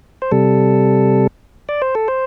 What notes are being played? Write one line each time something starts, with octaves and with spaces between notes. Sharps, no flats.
C5
C3 G3 A4
D5
C5
A4
C5